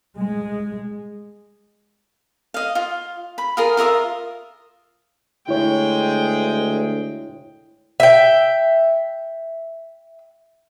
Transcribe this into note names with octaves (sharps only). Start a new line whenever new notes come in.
G#3
D#5 F5
F4
B5
F4 G#4 A#4
F4 A#4 E5 D#6
D2 G#3 E4 C#5 G5
E5 G5